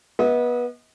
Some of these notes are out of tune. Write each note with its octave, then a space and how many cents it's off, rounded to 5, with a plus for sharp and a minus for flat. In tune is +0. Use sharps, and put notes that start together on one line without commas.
B3 -25 D#5 +35